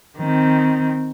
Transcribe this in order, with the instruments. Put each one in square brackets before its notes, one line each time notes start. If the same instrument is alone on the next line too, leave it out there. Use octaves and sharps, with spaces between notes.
[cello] D#3 C4